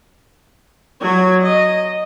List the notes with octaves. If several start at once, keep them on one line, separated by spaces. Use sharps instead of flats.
F#3 C#5
D#5